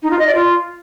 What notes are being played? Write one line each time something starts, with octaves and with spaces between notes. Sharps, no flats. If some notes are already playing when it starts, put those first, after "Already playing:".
D#4
F4
D#5
D5
F4